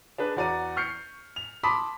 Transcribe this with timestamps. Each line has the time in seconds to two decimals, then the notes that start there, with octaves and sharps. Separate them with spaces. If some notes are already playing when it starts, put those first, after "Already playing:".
0.18 D4 G#4 B4
0.36 E2 F#4 D5 A#5 D#7
0.76 C#6 F6 G6 C7 C#7
1.36 F7
1.63 A5 B5 C6 D6 D#6 B6